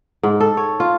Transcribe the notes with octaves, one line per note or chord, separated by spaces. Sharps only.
G#2
A4
C#5
F4